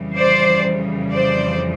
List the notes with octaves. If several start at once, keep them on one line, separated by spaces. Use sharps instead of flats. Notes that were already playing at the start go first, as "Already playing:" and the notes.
Already playing: F2 C#3 E3 G3
C5 D5
C5 D5